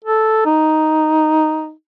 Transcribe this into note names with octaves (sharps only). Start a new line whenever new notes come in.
A4
D#4